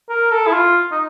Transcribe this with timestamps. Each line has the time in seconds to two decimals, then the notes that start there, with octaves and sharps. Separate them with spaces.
0.09 A#4
0.31 A4
0.47 E4
0.53 F4
0.92 D#4